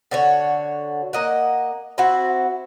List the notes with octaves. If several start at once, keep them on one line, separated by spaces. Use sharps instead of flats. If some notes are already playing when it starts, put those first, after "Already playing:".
D3 F#4 C#5
A#3 D#5 F#5
C4 E4 F#4